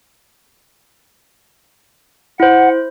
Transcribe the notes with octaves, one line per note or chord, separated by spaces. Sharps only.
E4 C5 F#5